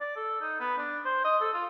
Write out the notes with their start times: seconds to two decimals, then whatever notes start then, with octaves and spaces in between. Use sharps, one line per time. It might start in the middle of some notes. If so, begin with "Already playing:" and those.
0.01 D5
0.16 A4
0.41 D#4
0.60 B3
0.78 D4
1.05 C5
1.25 D#5
1.41 A4
1.54 F4